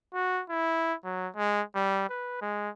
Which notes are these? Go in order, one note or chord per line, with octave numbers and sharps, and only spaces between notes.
F#4
E4
F#3
G#3
G3
B4
G#3